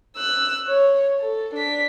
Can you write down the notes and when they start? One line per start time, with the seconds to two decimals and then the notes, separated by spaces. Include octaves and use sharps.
0.16 E6 F#6
0.68 C#5
1.20 A4
1.54 D4 B6